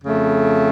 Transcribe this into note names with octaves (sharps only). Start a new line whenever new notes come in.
F2 C#3 A3